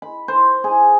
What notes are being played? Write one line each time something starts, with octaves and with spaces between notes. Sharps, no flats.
B5
C5
G#4